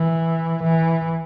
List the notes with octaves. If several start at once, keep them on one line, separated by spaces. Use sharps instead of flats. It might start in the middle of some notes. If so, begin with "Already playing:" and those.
Already playing: E3
E3